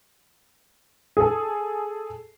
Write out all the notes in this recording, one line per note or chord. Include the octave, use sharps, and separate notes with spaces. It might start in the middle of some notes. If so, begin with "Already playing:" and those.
G#4 A4